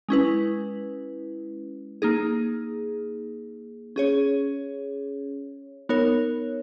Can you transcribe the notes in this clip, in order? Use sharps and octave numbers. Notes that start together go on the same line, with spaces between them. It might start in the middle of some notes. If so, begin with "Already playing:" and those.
G#3 C#4 E4 B4
A#3 D#4 G#4
C#4 G#4 C#5
B3 D#4 A#4 C#5